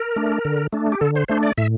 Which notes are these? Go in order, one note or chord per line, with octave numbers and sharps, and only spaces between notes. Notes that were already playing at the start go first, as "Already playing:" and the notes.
Already playing: A#4
A3 D4
D3
A3 D4
G4
D3 A4
C5
A3 D4 C5
D5
A2 E5